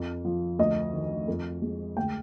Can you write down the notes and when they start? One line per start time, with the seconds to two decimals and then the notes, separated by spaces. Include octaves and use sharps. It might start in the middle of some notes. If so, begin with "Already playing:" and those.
Already playing: F2
0.25 F3
0.59 D2 D#5
0.93 D#3
1.28 F2
1.62 G#3
1.97 D2 G5